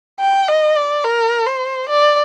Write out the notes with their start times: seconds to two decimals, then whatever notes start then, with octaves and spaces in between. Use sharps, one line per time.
0.20 G5
0.48 D#5
0.76 D5
1.04 A#4
1.46 C5
1.89 D5